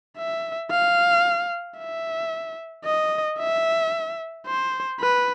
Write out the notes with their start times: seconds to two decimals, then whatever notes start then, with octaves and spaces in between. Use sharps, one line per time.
0.18 E5
0.71 F5
1.79 E5
2.85 D#5
3.39 E5
4.46 C5
5.00 B4